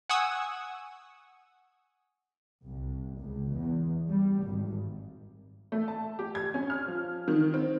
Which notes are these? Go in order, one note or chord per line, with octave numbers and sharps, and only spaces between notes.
F#5 G#5 C#6 D#6 E6
C2
C#2
E2
G3
G#1
A3
A5
G4
G#6
C#4
F6
F3
D#3
C4